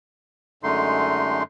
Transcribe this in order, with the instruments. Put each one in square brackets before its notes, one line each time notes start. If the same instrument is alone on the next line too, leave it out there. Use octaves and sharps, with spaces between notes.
[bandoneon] F#2 D3 G#3 A3 D#4 C6